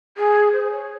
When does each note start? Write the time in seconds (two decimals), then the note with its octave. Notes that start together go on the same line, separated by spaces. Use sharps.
0.17 G#4
0.53 C5
0.64 C5
0.71 C#5